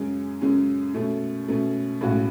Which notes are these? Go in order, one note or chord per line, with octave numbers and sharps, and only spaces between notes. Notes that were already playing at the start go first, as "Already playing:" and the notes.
Already playing: F#2 C#3 G#3 C#4
F#2 C#3 G#3 C#4
B2 A3 C#4
B2 A3 C#4
B1 A2 G#3 C#4 F#4